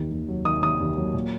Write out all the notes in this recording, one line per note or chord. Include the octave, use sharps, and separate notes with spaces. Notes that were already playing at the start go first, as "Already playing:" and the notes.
Already playing: D#2 D#3
D#2
F#3
D#3 D#6
D#2 D#6
D#2
F#3
A#2